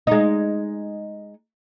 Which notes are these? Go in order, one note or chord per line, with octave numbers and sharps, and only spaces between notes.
G#3 D#4